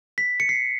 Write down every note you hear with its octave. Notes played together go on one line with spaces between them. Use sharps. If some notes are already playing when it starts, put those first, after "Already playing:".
B6
C#7
C7